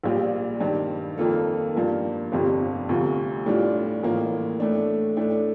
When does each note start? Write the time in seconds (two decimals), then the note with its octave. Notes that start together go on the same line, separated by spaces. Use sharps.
0.04 A#1 A#2 G3
0.60 G2 D#3 G3
1.18 F2 D#3 A#3 F4 A4
1.75 G2 F3 A#3
2.32 G1 F2 C3 G3
2.89 D2 C3 F3
3.46 A2 G3 D4 F4
4.03 A1 A2 F3 A#3
4.60 A2 A3 D4
5.17 A2 A3 D4